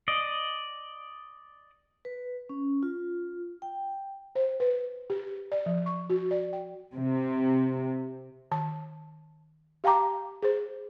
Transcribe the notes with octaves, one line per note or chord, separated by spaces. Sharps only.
D5 D#5
B4
C#4
F4
G5
C5
B4
G4
D5
F3
C#6
F#4
D5
G5
C3
D#3 A5
G4 F5 G5 A5 A#5 D6
G#4 C5